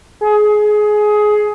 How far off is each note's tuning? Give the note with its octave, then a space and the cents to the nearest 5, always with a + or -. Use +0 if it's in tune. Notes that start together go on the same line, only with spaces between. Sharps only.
G#4 +20